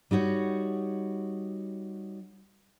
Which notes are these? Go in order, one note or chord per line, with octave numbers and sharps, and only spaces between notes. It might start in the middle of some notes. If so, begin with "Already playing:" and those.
G3 D#4 F#4 C#5